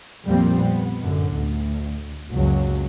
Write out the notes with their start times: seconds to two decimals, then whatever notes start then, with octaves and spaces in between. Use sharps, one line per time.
0.24 A#1 F2 A#2 G3 A#3 C4
0.57 B3
1.01 A1 F#2 D3
1.36 D2
2.32 F#1 C#2 F#3